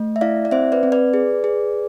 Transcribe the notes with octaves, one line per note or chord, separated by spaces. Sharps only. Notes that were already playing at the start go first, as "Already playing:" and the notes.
Already playing: A3
E5
E4 D5 F5
D5
C4 C5 E5
B4 D5
C4
B4 D5
G#4
G#4